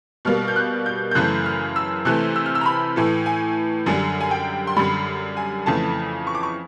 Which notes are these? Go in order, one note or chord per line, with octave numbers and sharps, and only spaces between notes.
B2 G3 A#3 F6
G6
F#6
G6
G6
F#2 C#3 E3 A3 F#6
F6
E6
C3 E3 A3 F#6
E6
F6
E6
A#5
B5
A2 E3 A3
G#5
F#2 D3 G3 G#5
G#5
G5
C6
F#2 D3 G3 B5
G#5
F2 C#3 E3 A3 A5
C#6
D6
C#6